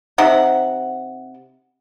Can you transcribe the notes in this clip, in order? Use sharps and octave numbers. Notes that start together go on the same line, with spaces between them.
C3 D#4 F#5